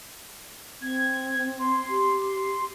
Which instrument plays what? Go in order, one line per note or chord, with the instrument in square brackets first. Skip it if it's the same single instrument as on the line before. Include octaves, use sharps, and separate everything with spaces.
[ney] C4 [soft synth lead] G#6
[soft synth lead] C6
[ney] G4